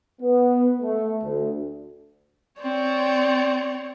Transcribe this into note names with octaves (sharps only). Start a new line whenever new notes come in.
B3
A3
D2
C4 C#5 D5